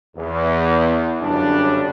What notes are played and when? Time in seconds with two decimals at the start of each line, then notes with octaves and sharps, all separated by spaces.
0.17 E2
1.22 G1 F#2 C#3 G3 D4